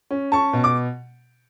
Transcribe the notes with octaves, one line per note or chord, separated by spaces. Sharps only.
C#4
C#4 A5 C#6
B2
D6